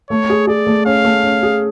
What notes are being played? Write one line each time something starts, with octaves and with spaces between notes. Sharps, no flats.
A3 C#5
G#4
G#4 D5
A3
C#4 F5
A3
C#4
G#4